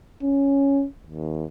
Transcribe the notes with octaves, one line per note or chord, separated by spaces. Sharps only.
C#4
D#2